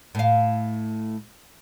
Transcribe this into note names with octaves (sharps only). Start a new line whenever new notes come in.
A2 F5